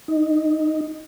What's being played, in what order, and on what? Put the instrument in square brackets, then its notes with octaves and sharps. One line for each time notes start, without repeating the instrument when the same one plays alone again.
[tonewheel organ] D#4